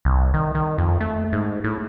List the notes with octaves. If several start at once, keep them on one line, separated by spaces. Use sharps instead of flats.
C2
D#3
D#3
F2
A3
G#2
A2